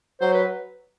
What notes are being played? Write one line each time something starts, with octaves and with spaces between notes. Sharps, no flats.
F#3 C5
B4